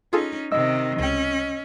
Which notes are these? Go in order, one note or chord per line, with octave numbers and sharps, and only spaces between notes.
C#4 D#4 F4 G#4 A4
C3 D#3 D#5 E6
C#2 C#4 G5